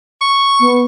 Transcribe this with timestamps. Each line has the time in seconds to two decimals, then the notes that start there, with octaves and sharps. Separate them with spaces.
0.21 C#6
0.59 B3